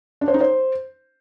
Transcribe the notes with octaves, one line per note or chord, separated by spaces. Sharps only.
D4
C5
D#4
C5